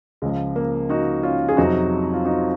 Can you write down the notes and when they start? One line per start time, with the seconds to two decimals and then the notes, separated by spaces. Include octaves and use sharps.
0.22 C#2 C#3 F3 G#3
0.56 A#3
0.89 D#4 F#4
1.23 C#4 F4
1.48 G#4
1.57 F2 C3 F#3 D#4 F#4
2.14 F4
2.25 D#4 F#4